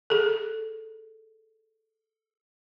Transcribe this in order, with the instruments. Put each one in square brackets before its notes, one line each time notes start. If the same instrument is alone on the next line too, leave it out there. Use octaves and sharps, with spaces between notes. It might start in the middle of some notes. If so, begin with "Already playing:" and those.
[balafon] G#4 A4